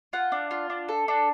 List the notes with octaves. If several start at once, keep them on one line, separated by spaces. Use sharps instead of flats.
F4 F#5
D4
F4
D4
A4
D4